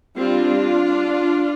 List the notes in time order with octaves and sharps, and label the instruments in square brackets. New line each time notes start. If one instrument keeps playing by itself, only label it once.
[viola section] G3 C4 D4 F4